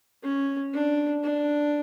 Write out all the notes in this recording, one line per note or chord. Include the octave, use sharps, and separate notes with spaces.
C#4
D4
D4